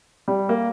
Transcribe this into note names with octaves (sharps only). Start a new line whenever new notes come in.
G3
A#3